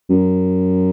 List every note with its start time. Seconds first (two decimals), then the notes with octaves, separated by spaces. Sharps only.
0.10 F#2